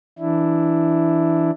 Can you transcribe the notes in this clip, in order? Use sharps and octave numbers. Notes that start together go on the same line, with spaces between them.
E3 D4 E4